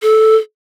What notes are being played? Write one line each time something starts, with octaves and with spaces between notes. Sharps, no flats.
A4